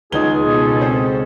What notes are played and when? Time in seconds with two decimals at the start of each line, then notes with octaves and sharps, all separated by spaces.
0.12 C#2 B3 D#4 F4 G#4 G7
0.45 B2 C#4 A4
0.81 C4 C5